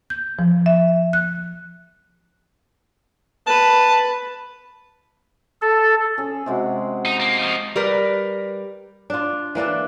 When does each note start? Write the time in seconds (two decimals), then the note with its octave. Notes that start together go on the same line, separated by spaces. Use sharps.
0.10 G6
0.39 F3
0.66 E5
1.13 F#6
3.47 B4 A5
5.62 A4
6.18 C#4 G#4
6.46 C3 G#3 F#4
7.06 D#4
7.20 A#3
7.39 F3 D#4
7.76 G3 A#4 B4
9.10 D4 F4
9.55 E3 A#3 D4 A4